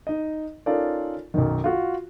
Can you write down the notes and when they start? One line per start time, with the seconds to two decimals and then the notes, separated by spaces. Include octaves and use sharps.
0.07 D#4 D#5
0.66 C#4 D#4 F4 A4 A#4 D5
1.34 B1 F#2 D#3
1.64 F4 F#4